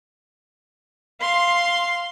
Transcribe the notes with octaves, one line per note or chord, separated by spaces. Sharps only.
F5 C6